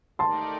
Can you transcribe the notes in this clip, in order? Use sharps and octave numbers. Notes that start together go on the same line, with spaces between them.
A3 D#4 G4 A#4 D5 A5 C6